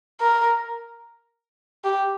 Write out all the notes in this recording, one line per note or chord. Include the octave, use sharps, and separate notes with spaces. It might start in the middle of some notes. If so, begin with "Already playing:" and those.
A#4
G4